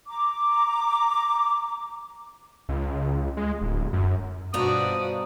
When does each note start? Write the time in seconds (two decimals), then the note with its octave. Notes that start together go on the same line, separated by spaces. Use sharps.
0.08 A#5 D6
2.69 C#2
3.37 G#3
3.61 D1
3.93 F#2
4.54 G2 B2 F3 D4 F#4 D5 A#5 D#6